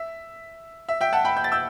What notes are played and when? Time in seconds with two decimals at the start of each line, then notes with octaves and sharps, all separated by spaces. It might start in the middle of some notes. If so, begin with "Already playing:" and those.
Already playing: E5
0.89 E5
1.01 E5 G5
1.13 F#5 A5
1.25 G5 B5
1.37 G6
1.44 A6
1.52 E6 G6